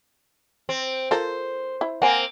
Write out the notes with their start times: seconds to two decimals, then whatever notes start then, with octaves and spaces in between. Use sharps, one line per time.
0.69 C4
1.11 F4 A4 A#4 C5
1.81 E4
2.02 A#3 C4 F#5 G#5